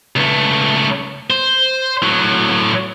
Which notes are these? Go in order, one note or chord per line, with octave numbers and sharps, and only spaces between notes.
C#2 A3
C5
A2 F#3